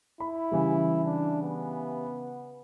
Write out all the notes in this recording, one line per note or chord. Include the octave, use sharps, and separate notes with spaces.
E4 B5
C#3 E3 G3
D4
B3